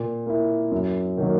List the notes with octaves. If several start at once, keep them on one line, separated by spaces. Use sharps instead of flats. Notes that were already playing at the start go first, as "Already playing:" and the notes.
Already playing: A#2
A#3 E4
F#2
D#3 F#3 A#3